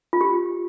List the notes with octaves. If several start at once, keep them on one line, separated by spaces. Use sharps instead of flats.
F4
G4